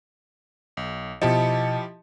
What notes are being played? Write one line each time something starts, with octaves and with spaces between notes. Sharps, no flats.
B1
B2 F3 E4 G4 D#5 A5 C#7